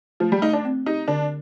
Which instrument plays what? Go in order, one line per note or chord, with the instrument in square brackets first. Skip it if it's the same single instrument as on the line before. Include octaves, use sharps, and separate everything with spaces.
[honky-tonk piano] F3 [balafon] A3
[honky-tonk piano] G3
[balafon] A3 [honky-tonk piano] D#4
[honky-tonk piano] D4
[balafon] C4
[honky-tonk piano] D#4 [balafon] G4
[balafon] D3 [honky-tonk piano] D4